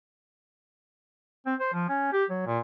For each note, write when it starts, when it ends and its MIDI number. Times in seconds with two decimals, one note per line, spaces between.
1.46 1.55 60
1.60 1.69 72
1.73 1.86 53
1.89 2.08 61
2.13 2.24 67
2.30 2.42 54
2.46 2.60 46